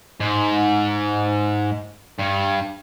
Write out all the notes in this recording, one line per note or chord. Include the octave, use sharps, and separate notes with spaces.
G#2
G2